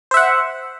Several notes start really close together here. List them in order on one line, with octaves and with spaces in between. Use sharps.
C5 E5 F#5